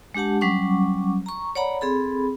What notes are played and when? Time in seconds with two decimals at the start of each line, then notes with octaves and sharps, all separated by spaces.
0.15 G#3 D4 G4 F#5 A5
0.41 F#3 G3 C#4 F#5 C#6 D6
1.26 A#5 C#6
1.55 C#5 D5 F#5 A#5 B5
1.81 C4 G#4 A4 B5